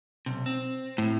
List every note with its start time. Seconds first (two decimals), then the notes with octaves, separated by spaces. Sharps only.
0.26 B1 C3
0.46 C4
0.98 A2